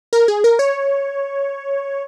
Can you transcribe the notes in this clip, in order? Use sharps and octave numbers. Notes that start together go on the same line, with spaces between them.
A#4
G#4
A#4
C#5